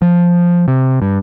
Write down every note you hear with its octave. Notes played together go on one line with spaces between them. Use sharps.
F3
C3
G2